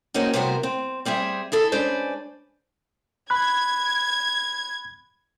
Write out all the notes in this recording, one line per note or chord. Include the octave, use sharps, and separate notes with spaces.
A#3 C4 C#4 D#4 F#4
C3 G3 B3 F#4 A#4 C5
C4
G3 C4 G#4 E5
E4 G#4 A4
G#3 C#4 D4 B4 C5 D5
B5 F#6 G#6